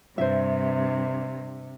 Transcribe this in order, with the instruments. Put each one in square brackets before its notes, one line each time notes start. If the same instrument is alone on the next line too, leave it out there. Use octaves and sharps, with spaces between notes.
[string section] G2 [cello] C3 [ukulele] C5 E5